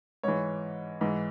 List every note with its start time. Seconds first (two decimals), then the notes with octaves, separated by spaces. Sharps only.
0.23 G#2 E3 C#5
1.01 G#2 E3